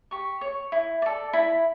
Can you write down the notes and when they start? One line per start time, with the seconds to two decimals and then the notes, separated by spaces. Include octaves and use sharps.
0.11 G4 C#6
0.41 C#5
0.72 E4
1.02 A4 D5
1.33 E4 B5